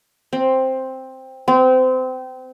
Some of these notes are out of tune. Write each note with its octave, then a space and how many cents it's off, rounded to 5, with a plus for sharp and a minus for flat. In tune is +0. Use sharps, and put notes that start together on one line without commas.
C4 +5
C4 -25